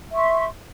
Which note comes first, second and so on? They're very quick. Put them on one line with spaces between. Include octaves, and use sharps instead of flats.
E5 C#6 C6